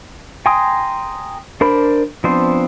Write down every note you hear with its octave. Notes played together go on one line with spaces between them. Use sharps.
G5 G#5 A#5 C6 D#6
D4 A#4 C5 B5
F3 B3 C4 D4 C5